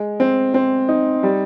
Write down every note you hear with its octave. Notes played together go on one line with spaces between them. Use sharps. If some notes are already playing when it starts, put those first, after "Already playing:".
Already playing: G#3
C4
C4
D#4
G3